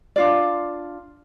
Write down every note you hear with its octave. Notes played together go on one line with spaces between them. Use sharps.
D4 F4 D5